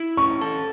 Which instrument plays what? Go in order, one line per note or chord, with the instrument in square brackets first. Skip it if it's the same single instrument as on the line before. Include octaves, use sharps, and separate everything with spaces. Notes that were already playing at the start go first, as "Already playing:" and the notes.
Already playing: [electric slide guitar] E4
[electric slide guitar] C#4 [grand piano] C#6
[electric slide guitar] A4